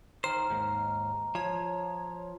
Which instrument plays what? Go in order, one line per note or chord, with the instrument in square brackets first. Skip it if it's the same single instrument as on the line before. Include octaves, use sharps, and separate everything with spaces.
[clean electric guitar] D#3 C5 [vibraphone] A#5 [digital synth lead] F6
[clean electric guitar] D#2 G#2
[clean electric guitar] F3 [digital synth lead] C#5